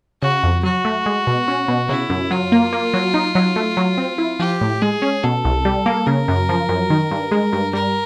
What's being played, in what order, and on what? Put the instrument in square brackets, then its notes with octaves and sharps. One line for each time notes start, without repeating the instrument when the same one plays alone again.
[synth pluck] C#3 [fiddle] F#4
[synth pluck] F2
[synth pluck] F#3 [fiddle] F#4
[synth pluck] A3
G#3
B2
C#4
B2
[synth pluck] C#3 [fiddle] E4
[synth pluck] F#2
[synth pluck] F#3 [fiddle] F4
[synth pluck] A#3
A#3
F#3
D#4
F#3
A3
F#3
C4
E4
[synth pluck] F3 [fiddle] G4
[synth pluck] A2
[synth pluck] G#3 [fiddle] G#4
[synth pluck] C#4
[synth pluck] B2 [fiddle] A4
[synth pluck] C2
G3
A#3
[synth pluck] C#3 [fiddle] A#4
[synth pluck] F#2
F3
F#2
D#3
G2
G#3
G2
[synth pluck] G3 [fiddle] A#4